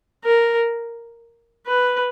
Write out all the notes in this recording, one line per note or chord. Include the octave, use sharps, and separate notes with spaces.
A#4
B4